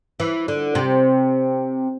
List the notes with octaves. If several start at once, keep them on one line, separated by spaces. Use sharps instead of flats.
E3
D3
C3